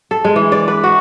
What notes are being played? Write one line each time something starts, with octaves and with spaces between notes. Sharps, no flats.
A4
G#3
E3
D5
B4
F#4